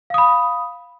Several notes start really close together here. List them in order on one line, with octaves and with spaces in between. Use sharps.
F5 D#6 B5